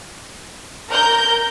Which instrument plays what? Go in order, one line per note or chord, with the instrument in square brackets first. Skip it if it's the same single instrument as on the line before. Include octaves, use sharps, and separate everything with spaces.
[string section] A#4 G6